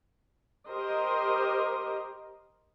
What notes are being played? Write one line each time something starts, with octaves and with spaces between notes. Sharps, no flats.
G4 A#4 C5 D#5